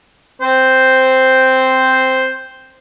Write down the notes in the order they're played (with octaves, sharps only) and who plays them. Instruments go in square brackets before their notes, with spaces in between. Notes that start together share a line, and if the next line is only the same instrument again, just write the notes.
[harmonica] C4 C5